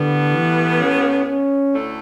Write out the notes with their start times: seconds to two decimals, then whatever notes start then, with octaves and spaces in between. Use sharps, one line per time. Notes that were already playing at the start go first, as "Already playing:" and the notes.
Already playing: A2 D3 G3 B3
0.32 E3
0.79 C#4
1.27 C#4
1.73 D2 D3 A3 E4